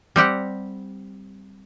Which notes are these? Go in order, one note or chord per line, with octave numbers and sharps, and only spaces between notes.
G3 C4 G4 F#5